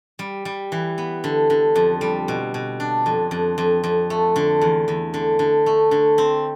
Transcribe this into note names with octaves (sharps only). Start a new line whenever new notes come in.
G3
G3
E3
B3
D3
D3
F2
G3
B2
B2
D4
F2
F2
F2
F2
A3
D3
E2
E2
D3
D3
A3
D3
C4